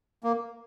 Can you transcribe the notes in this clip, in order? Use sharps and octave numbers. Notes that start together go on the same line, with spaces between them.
A#3